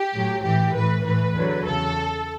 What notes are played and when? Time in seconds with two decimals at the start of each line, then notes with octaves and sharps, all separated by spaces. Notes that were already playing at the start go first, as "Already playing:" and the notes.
Already playing: G4
0.13 A2 F#3
0.44 A2 E3 G4
0.74 A2 E3 B4
1.05 A2 E3 B4
1.36 E2 D3 F#3
1.66 E2 C#3 A4